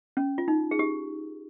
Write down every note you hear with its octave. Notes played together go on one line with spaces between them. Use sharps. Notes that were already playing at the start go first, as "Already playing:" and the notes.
C#4
F4
D#4
G#4
G4